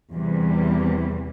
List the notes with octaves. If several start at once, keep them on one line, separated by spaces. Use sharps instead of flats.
E2 C3 E3 G3